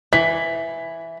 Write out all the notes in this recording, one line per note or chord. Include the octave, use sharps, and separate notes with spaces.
E3 B6